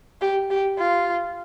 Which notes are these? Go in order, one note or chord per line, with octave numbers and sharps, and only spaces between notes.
G4
G4
F4